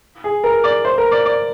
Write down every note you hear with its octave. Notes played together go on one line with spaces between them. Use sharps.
G#4
A#4
D5
C5
A#4
D5
D5